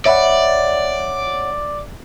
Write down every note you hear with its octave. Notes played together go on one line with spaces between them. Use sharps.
C#5 D5 E5 F#5 G#5 B5